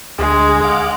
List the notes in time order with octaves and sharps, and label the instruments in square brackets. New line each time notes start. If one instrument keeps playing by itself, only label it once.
[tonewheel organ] D2 G#4 [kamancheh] G#3
[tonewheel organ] F5 F#5 D6